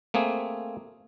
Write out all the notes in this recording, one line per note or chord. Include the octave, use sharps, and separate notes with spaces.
A3 A#3 C4 G#4